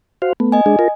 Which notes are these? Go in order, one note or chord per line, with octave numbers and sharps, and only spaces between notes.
F#4 C5 F5
A3 B3
D#5 G#5
G#3 D4 G#4
F4 A#4